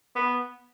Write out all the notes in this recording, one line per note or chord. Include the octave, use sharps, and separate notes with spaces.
B3